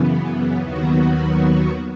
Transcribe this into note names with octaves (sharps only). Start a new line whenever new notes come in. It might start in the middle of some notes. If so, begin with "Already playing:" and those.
Already playing: F#2 C#3 E3 B3
D#2 D#3 F#3 B3 F#4